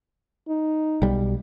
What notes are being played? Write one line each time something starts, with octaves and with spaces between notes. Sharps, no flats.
D#4
B1 G3